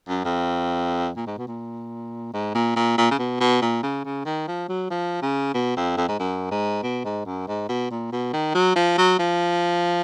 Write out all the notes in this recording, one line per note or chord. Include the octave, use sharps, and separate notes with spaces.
F#2
F2
A#2
G#2
B2
A#2
G#2
A#2
A#2
A#2
C#3
B2
B2
A#2
C#3
C#3
D#3
F3
F#3
F3
C#3
B2
F2
F2
G#2
F#2
G#2
B2
G#2
F#2
G#2
B2
A#2
B2
D#3
F#3
F3
F#3
F3